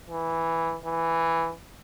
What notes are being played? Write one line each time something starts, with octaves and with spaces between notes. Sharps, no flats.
E3
E3